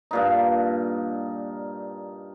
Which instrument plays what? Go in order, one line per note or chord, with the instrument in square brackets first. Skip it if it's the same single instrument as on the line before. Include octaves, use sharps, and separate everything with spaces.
[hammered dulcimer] G2 A#2 D#4